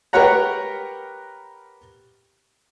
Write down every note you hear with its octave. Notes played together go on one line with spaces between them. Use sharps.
G4 A#4 B4 C#5 F#5 A#5